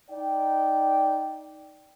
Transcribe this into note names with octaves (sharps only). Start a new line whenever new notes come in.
D#4 D5 G5